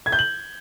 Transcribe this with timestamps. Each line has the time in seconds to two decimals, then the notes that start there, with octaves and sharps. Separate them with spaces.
0.06 G#6
0.12 G6
0.19 F#7